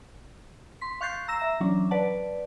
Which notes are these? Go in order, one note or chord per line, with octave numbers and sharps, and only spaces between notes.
C6 B6
F5 C#6 F#6 G6 A6 C7
A#5 E6 A#6 E7
E5 A#5
E3 F#3 C#4 D4
B4 D5 F#5 A5